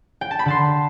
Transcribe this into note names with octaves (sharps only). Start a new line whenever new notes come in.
G5
A5
B5
D3 A5 C6